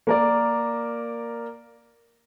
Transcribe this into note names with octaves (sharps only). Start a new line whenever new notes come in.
A#3 A#4 D5